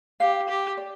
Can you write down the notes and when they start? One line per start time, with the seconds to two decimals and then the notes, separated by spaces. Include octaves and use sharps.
0.20 G4 F5
0.49 G4
0.77 D5